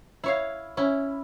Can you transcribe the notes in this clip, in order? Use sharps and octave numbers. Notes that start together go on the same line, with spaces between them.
E4 C#5 F5
C#4 E4